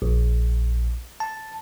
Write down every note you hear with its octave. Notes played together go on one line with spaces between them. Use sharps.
A#1
A5